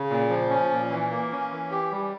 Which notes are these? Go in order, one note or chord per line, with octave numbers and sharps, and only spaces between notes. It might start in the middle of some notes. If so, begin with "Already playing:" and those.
Already playing: C#3
A#2
F3
C#4
A#2
E3
A#3
C#4
E3
G4
G3